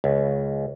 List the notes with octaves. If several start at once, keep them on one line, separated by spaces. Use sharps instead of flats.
C#2